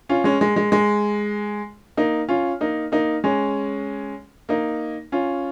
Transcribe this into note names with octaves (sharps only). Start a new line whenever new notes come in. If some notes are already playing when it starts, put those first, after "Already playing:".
C#4 F4
G#3 C#4
G#3
G#3
G#3
A#3 D#4
C#4 F4
A#3 D#4
A#3 D#4
G#3 C#4
A#3 D#4
C#4 F4